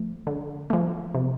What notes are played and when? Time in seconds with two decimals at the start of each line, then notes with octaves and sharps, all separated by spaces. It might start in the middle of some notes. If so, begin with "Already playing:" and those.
Already playing: F3 A3
0.27 D3
0.70 F3 A3
1.15 C3